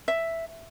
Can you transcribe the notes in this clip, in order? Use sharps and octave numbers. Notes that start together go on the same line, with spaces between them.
E5